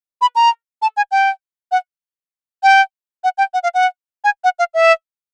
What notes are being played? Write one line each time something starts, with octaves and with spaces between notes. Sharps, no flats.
B5
A#5
A5
G#5
G5
F#5
G5
F#5
G5
F#5
F5
F#5
G#5
F#5
F5
E5